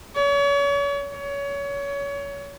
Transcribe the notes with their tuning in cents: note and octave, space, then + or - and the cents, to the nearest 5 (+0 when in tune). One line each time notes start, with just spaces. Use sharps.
C#5 +35
C#5 +25